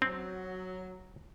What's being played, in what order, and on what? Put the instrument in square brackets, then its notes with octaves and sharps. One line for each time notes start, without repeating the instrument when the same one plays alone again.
[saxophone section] F#3 [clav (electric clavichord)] C4